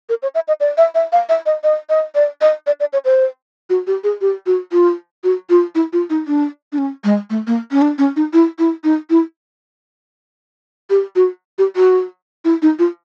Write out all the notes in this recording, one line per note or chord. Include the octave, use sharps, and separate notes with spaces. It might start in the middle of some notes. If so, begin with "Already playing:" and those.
A#4
C#5
E5
D#5
D5
E5
E5
F5
E5
D#5
D#5
D#5
D5
D#5
D5
D5
C#5
C5
F#4
G4
G#4
G4
F#4
F4
F#4
F4
E4
F4
D#4
D4
D4
C#4
G#3
A3
A#3
C#4
D4
C#4
D#4
E4
E4
D#4
E4
G4
F#4
G4
F#4
E4
D#4
F4